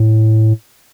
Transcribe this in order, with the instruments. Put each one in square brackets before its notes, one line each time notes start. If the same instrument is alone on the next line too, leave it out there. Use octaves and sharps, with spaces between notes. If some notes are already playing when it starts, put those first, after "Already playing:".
Already playing: [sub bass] A2